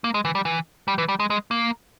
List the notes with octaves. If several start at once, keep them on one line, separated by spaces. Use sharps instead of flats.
A#3
G#3
E3
G3
E3
G3
E3
G3
G#3
G#3
A#3